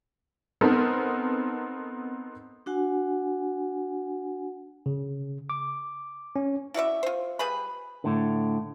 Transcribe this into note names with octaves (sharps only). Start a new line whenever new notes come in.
B3 C4 D#4 A4 A#4
D4 F#4 F#5 G#5
C#3
D6
C#4
E4 F#4 D5 E5
F4 C5
G3 G#4 B4 B5
A2 D3